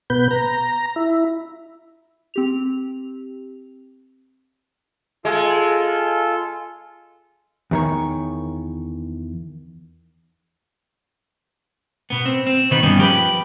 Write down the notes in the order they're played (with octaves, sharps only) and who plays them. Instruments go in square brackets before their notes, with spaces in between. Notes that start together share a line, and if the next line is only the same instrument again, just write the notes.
[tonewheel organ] B2 B3 B4 G6
A#5
E4
[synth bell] C4 G4 F7
[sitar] G#3 [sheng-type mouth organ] F4 A4
[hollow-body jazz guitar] E2 D#3 C#5
[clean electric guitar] B2 B3
C4
C4
B2 D#3 B3 D#4 B4
G2 B3 C#4 D#4
F3 G4 A#4 B4